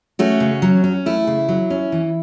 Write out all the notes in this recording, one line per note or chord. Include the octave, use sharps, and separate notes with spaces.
A3 C#4 F#4
C#3
F#3
C#4
A3 E4
C#3
F#3
C#4
E3